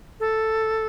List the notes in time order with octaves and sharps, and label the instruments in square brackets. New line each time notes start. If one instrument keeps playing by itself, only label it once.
[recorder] A4